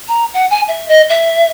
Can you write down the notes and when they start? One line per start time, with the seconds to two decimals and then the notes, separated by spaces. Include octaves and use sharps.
0.08 A#5
0.34 F#5
0.51 G#5
0.68 E5
0.88 D#5
1.09 E5